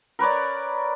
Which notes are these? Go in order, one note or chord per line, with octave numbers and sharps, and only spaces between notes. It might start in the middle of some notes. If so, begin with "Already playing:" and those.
A#4 B4 C#5 D5